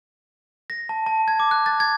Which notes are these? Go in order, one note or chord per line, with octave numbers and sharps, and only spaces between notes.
A#6
A5
A5
G#6
D6
F#6
A6
G#6